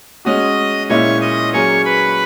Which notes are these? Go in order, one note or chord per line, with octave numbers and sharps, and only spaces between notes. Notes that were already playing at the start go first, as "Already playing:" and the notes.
G#3 C#4 F#4 D#5 D#6
A#2 G#3 C#4 E4 C#5 C#6
D#5 D#6
F#3 A#3 C#4 G#4 C#5 C#6
B4 B5